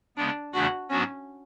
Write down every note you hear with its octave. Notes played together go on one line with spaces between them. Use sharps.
C#3 G#3 B3 D4
E2 C#3 E3 A3 D4 F#4
G#2 F#3 B3 C#4 D4 F#4